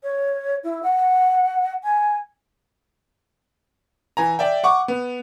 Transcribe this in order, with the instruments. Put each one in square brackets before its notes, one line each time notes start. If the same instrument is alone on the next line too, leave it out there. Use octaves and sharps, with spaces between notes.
[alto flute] C#5
E4
F#5
G#5
[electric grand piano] E3 G#5 A#5
D5 E5 G5
F#5 C#6 D6
B3